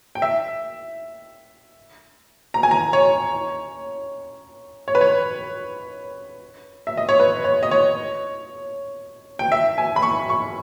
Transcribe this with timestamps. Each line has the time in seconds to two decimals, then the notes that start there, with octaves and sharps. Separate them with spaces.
0.15 G5
0.22 E5
2.54 A#5
2.63 G#5
2.71 A#5
2.93 C#5
4.88 C#5
4.95 B4
5.01 C#5
6.87 E5
6.97 D#5
7.09 C#5
7.20 B4
7.44 C#5
7.63 D#5
7.71 C#5
9.39 G5
9.52 E5
9.78 G#5
9.96 B5
10.02 C#6
10.29 C#6